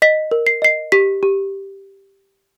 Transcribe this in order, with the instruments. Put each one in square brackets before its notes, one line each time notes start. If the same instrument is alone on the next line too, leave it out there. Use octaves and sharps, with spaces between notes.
[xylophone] D#5 B6
A#4
C7
D#5 C7
G4 B6
G4